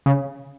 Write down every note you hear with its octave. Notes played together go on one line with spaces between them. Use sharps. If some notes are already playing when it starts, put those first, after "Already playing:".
C#3